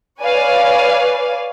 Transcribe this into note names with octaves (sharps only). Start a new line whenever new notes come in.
B4 C#5 D5 F5 G#5